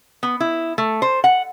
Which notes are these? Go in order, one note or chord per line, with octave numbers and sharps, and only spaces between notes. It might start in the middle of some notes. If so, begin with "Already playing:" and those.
B3
E4
A3
C5
F#5